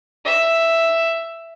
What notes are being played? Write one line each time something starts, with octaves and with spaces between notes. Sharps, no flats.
E5